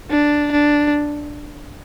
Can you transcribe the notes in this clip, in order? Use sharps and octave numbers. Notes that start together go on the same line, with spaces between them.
D4
D4